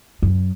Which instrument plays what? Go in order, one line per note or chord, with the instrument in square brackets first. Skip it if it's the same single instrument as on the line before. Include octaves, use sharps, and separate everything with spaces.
[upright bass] F#2